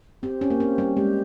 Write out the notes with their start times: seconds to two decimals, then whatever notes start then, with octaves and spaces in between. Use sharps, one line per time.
0.23 C4 G4
0.41 C#4
0.50 A#3
0.59 C4 C#4
0.78 G3
0.96 G#3 G4